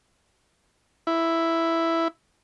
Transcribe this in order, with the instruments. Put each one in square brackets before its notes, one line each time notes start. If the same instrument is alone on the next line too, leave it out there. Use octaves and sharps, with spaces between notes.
[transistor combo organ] E4